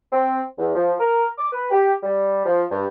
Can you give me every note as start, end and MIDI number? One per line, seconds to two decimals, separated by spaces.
0.12 0.41 60
0.58 0.73 40
0.74 0.92 53
0.99 1.26 70
1.38 1.47 86
1.52 1.65 71
1.70 1.93 67
2.03 2.42 55
2.45 2.63 53
2.71 2.86 43